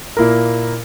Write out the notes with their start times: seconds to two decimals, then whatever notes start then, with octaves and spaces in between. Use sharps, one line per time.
0.17 A#2 A#3 E4 A#4